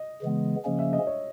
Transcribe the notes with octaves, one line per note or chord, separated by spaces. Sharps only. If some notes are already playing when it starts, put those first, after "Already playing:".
Already playing: D#5
C#3 E3 G#3 B3
C#3 F3 A#3 C#4 D#5
E5
D#5
C#5